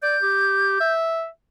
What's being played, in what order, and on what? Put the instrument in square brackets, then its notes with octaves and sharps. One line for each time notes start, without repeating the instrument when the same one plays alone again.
[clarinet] D5 [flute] G6
[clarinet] G4
E5